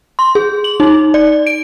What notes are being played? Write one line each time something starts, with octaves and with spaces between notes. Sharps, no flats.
C6
G#4
F#7
D#4
D5
D7